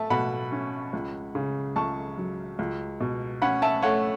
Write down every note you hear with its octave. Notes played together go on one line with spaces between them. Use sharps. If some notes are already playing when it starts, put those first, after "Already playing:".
Already playing: A3 E5 A5
B2 F#5 B5
C#4
C#2
C#3
C#2 A5 C#6
F#3
C#2
B2
C#4 F#5 B5
E5 A5
A3 C#5 F#5